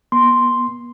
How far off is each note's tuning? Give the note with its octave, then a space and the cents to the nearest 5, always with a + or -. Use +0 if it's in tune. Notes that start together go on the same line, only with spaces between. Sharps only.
B3 -40 C6 +0